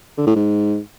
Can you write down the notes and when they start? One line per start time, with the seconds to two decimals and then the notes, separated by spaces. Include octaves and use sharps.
0.18 D3
0.27 A2
0.36 G#2